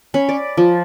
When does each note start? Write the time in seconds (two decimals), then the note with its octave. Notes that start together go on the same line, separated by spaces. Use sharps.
0.14 C#4 B5
0.29 D5
0.57 F3